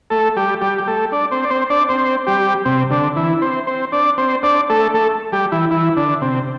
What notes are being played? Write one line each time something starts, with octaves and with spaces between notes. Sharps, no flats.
A3 A4
G3 G4
G3 G4
G4
A3 A4
D4 D5
C4 C5
D5
C4 C5
D4 D5
C4 C5
G3 G4
C3 C4
D3 D4
E3 E4
C4 C5
C4 C5
D4 D5
C4 C5
D4 D5
A3 A4
A3 A4
G3 G4
E3 E4
E3 E4
D3 D4
C3 C4